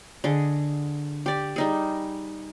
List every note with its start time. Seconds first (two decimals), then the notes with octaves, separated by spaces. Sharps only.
0.24 D3 G#4 D#5
1.26 G4 D5
1.56 G3 D#4 G#4